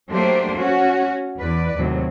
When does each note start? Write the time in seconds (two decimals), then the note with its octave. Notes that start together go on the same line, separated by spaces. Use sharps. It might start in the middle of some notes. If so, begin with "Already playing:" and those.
0.10 F#3 A3 A#3 D4 G4 C5
0.57 C#4 F#4
1.37 E2 B4 D5
1.77 D#2 A2 C3 F#3